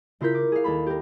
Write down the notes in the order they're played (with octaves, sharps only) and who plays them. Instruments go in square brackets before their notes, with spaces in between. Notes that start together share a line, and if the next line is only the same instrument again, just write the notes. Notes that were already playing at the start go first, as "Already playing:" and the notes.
[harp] C#3 E4 F4 A#4 G6 B6
D6
G#4 F5
D#2 A4 B5
G4 A#4